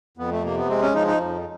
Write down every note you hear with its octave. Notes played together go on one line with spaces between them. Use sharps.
F2 B3
A3
C3 A#3
B3
G#3 C4
C#4
F3 D#4
D#4
F2